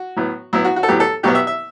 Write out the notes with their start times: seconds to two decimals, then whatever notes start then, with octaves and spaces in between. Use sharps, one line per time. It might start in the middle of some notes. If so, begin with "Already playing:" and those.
Already playing: F#4
0.16 A2 F#3 B3
0.53 A2 F#3 B3 E4
0.65 F#4
0.76 F#4
0.83 A4
0.88 A2 F#3 B3 G4
1.00 A4
1.23 C2 B2 F#3 B3 G4
1.35 E5
1.47 E5